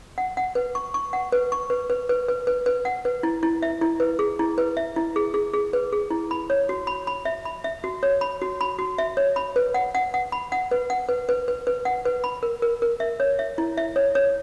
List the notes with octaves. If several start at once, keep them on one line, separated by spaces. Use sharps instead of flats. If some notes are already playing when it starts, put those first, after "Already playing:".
F#5
F#5
B4
C#6
C#6
F#5
B4
C#6
B4
B4
B4
B4
B4
B4
F#5
B4
E4
E4
E5
E4
B4
G#4
E4
B4
E5
E4
G#4
G#4
G#4
B4
G#4
E4
B5
C#5
F#4
B5
B5
E5
B5
E5
F#4
C#5
B5
F#4
B5
F#4
E5
C#5
B5
B4
F#5
F#5
F#5
B5
F#5
B4
F#5
B4
B4
B4
B4
F#5
B4
B5
A#4
A#4
A#4
E5
C#5
E5
E4
E5
C#5
C#5